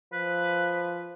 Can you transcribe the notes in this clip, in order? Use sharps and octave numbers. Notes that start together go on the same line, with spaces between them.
F3 B4